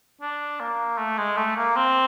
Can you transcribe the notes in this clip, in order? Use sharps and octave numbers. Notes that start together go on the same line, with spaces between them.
D4
A#3
A3
G#3
A3
A#3
C4